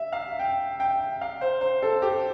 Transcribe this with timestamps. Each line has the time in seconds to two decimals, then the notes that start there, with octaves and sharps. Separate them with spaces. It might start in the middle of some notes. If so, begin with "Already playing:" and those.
Already playing: E5
0.12 F5
0.39 G5
0.80 G5
1.21 F5
1.41 C5
1.61 C5
1.82 A4
2.02 G4